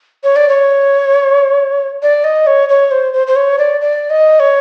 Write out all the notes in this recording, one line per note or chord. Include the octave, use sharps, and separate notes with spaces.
C#5
D5
C#5
D5
D#5
C#5
C#5
C5
C5
C5
C#5
D5
D5
D#5
C#5